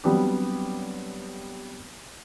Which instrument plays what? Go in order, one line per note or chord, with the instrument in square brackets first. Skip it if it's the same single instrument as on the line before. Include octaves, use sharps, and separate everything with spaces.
[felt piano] F#3 G3 B3 C4 D4 G4